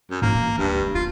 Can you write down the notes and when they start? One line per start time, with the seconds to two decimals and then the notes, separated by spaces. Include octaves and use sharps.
0.10 F#2
0.22 G#2 A#3
0.35 E3
0.58 D2 G2
0.79 A3
0.95 B3 F4